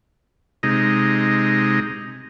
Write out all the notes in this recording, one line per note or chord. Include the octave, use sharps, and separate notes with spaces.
C3 G#3 D#4